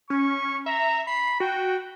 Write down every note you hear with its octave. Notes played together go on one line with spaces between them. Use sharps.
C#4 C#6
E5 A#5
B5 C7
F#4 G5